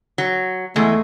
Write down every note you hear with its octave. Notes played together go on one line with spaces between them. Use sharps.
F#3
E2 G#3 A3